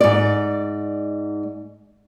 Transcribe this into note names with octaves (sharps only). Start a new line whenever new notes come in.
G#2 D5